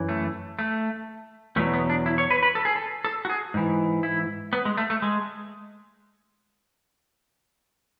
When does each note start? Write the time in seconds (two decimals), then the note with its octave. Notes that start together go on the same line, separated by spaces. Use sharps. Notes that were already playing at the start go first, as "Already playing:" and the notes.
Already playing: F#2 E3
0.09 A3
0.59 A3
1.56 E2 B2 F#3 A3
1.74 B3
1.90 D4
2.06 E4
2.18 C#5
2.30 B4
2.43 B4
2.55 A4
2.65 G#4
2.76 A4
3.04 A4
3.25 F#4
3.29 G#4
3.54 G#2 E3
4.03 E4
4.53 B3
4.65 G#3
4.77 A3
4.90 A3
5.02 G#3